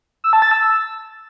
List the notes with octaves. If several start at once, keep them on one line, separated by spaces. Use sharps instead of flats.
E6
A5
A6
E6